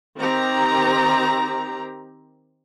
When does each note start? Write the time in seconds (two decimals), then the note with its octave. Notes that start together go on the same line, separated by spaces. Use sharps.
0.18 D#3 C4 G4 A#5